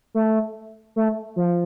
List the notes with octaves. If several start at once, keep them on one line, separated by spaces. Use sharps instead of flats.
A3
A3
F3